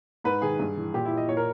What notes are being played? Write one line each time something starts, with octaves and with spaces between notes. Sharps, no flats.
G#2 B4
D#3 G#4
G2
E3
A#2 G4
E4
D#5
A#2 C#5
A#4